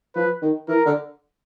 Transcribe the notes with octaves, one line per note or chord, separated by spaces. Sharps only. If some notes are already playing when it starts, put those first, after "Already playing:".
F3 B4
D#3
E3 A#4
D3